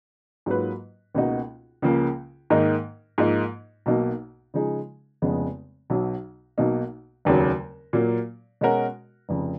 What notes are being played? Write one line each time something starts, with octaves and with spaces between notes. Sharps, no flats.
G#2 F#3 A#3 F4 B4
C#2 B2 A#3 D#4 F#4
C#2 C#3 F3 A#3
G#2 D#3 A#3 D#4 A#4
G#2 F3 A#3 D#4
B1 B2 A#3 D#4
C#3 F3 G#3 D#4 G#4
F1 F2 C#3 G#3 B3
B1 B2 F#3
B1 B2 A#3 D#4
F1 D#2 C#3 F#3
A#2 F#3 A#3
B2 G#3 C#4 F#4 A#4
F1 F2 C#3